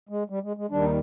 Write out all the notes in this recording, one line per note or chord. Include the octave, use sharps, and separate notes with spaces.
G#3
G3
G#3
G#3
D#2 D#3 G3 D4
D#4